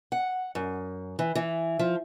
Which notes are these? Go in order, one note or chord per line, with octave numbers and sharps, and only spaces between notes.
F#5
F#2
E3
E3
F3